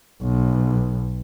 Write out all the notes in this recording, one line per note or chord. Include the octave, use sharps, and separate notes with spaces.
B1